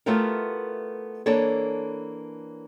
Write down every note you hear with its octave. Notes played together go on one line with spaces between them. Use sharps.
A3 B3 E4 F4 G4 A#4
E3 A#3 D4 A4 C#5